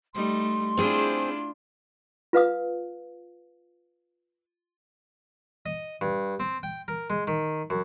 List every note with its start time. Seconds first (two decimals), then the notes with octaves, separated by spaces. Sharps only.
0.14 G3 A3 D#4 C6
0.77 C4 D4 E4 F4 G#4 C5
2.33 F4 B4 F5 D#6
5.66 D#5
6.01 G2
6.40 C4
6.63 G5
6.88 A#4
7.10 G#3
7.27 D#3
7.70 F#2